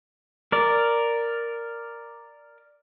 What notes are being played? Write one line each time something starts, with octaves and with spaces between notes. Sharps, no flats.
A#4 D5